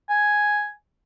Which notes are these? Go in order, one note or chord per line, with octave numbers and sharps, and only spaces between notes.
G#5